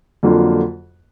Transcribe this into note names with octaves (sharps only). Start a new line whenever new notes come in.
F2 D3 F#3 A#3 F4